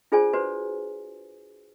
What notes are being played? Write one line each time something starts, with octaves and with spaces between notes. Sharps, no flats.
D4 F4 G#4 C5 D5 G#5
F#4 B4 C5 D5